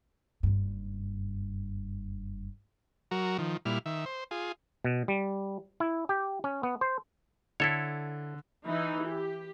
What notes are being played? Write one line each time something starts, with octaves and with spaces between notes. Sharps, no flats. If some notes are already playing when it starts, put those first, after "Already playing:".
F#1 G2
F#3 F#4 A#4
D#3 F3
A#2 G3 E4 F6
D#3 E5
C5
F4 G#4
B2
G3
E4
G4
C#4
B3
C5
D3 E4 A4 C#5
E3 D#4
G4